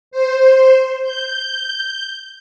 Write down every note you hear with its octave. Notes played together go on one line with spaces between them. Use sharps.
C5
G6